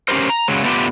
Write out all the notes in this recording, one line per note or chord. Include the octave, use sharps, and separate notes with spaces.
C#4 D#4 G4 A#4 C5
A#5
C#3 F#3 G#3
A3 B3 D4 F4 G4